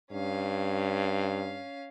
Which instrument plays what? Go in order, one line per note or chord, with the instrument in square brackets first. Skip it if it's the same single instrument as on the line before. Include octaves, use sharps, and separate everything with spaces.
[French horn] G2 [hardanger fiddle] C#4 F5